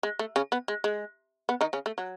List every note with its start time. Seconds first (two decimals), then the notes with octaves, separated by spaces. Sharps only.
0.03 G#3
0.19 A3
0.36 C#3 C#4
0.52 B3
0.68 G#3
0.84 G#3
1.49 B3
1.61 D#3 D#4
1.73 C#3 C#4
1.86 A3
1.98 F#3